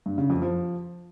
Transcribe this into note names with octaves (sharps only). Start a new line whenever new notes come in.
G2
C#3
F2
F3